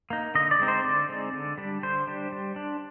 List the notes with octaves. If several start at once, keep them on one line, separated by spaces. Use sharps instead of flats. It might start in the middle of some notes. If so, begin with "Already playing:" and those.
A#3 D#4
D3 D#5
D5
G#3 C4 D#4
C5
D3 D5
G#3 C4 D#4
D3
G3 D4
D3 C5
G3 D4
G3
D4